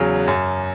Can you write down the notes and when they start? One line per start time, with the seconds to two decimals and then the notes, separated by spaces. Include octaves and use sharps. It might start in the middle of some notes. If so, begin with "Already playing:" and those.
Already playing: E2 C#3 F#3
0.28 F#2